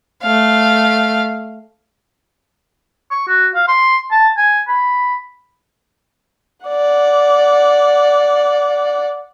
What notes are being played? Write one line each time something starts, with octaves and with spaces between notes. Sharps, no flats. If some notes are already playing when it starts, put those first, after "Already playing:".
A3 F5
C#6
F#4
F5
C6
A5
G#5
B5
D5 F#5